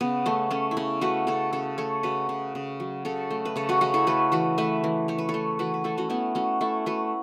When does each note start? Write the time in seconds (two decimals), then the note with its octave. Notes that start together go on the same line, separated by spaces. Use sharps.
0.01 C#3 B3
0.26 A3 C#4
0.51 A3 C#4
0.71 E4
0.77 C#3 C#4
1.01 A3 F#4 B4
1.27 C#3 A4 C#5
1.53 C#3 A4 C#5
1.78 A3 A4 C#5
2.03 C#3 F#4 B4
2.29 C#3
2.55 C#3
2.80 F#3
3.05 C#3 A4 C#5
3.31 A3
3.45 B4
3.56 C#3 A4 C#5
3.69 F#4 B4
3.81 C#3 C#4 F#4
3.94 E4 A4
4.07 A3 F#4 B4
4.32 E3 F#4 B4
4.58 A3 B4 E5
4.84 E3
5.08 A3 C#5
5.18 B4
5.29 A4 C#5
5.34 A3
5.59 E3 F#4 B4
5.74 B4
5.84 A3 E4 A4
5.97 C#4 F#4
6.10 A3 B3 E4
6.35 A3 C#4 F#4
6.61 A3 E4 A4
6.86 A3 F#4 B4